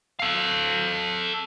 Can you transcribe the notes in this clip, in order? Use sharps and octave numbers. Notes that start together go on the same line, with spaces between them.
A4 F5